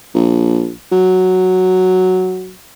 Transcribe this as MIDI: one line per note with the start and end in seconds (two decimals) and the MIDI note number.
0.15 0.71 34
0.92 2.53 54